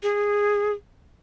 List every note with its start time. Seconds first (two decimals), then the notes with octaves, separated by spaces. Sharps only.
0.03 G#4